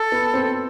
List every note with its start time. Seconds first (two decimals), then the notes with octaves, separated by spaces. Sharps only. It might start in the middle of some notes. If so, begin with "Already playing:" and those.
Already playing: A4
0.12 B3
0.34 C4